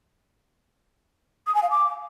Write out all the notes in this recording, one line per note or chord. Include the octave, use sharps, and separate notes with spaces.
D#6
G#5
F5
D6